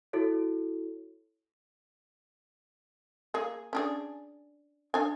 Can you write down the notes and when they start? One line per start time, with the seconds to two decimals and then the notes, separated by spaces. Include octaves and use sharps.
0.13 E4 F#4 A4 C#5
3.34 A#3 G#4
3.73 C#4 D4 G#4
4.94 D4 G#5